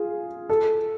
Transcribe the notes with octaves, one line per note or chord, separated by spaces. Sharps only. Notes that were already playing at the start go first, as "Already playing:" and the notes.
Already playing: F4 G#4
A4